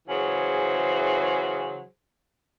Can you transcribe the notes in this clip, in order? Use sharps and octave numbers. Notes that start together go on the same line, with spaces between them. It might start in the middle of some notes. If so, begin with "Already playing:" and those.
C#3 E3 F#3 G#4 C5